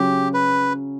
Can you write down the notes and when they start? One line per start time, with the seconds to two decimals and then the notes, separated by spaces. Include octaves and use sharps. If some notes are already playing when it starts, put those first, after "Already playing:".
Already playing: C#3 F#3 C#4 G4
0.34 B4